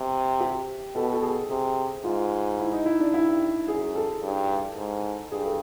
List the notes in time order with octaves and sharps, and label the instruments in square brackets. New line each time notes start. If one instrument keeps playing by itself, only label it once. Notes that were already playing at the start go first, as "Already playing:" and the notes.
Already playing: [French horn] C3
[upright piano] G4
[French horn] B2 [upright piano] A4
[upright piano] A4
G#4
[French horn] C3 [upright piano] G#4
[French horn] G#2 [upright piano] F4
[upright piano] E4
D#4
E4
D4
[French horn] G2 [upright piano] E4
[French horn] F#2 [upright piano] G#4
[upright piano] A4
[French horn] G2
G#2
[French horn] G2 [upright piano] G#4
[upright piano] A4